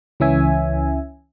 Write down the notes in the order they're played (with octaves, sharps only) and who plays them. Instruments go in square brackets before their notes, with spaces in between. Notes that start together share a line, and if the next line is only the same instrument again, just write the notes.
[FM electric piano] C#2 E3 C#4 E5 G#5